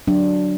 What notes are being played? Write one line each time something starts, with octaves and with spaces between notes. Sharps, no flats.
F#3 D4